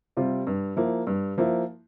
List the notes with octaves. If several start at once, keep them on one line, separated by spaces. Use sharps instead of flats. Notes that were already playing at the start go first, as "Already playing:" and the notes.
C3 G3 C4 F4
G2
F3 A#3 E4
G2
F3 A#3 E4